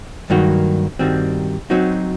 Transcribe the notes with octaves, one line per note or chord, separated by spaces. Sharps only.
G2 D#3 F#3 A#3 F#4
G2 D#3 G3 C4 F#4
F#3 C4 D#4 F#4